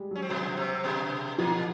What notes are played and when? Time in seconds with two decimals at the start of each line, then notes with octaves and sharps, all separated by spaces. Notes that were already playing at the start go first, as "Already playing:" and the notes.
Already playing: G3 G#3
0.11 F#3 C#4
0.22 C4
0.29 B2 F#3 B3
0.57 C3 C4
0.84 B2 B3
1.38 A#2 F3 A#3